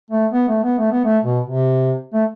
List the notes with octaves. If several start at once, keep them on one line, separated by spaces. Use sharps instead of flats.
A3
B3
A3
B3
A3
B3
A3
B2
C3
A3